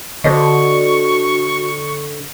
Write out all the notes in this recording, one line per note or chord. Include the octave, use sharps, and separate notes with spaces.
D3 F#4 C5 D#5 C#6